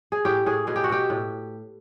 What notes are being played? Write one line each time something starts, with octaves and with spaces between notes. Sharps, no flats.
G#4
A2 G4
A2 G#4
B2 G#4
G4
F#4
B2 G4
A2